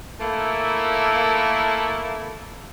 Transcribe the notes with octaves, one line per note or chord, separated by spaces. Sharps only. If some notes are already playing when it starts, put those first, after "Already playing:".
A3 A#3 E4